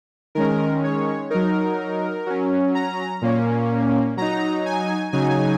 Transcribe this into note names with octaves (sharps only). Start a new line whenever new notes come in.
D#3 G#3 C#4 A#4
C#5
F#3 D#4 A#4
F#3 C#4
A#5
A#2 A#3 C#4
F#3 D#4 A#5
G#5
C#3 F#3 D#4 G#5